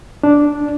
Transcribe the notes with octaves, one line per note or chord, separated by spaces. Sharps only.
D4